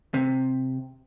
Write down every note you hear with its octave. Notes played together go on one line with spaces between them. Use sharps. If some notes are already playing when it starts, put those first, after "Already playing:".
C3